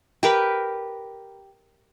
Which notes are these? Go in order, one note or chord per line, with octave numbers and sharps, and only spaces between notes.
G4 A#4 B4